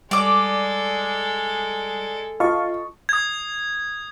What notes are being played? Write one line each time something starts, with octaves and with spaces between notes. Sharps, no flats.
G3 G#3 A4 D5 D6
F4 D#5 A5 C#6
D#6 G#6